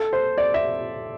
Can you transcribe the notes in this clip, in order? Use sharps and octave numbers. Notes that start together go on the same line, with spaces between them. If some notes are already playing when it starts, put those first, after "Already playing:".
Already playing: A4
C5
D5
E5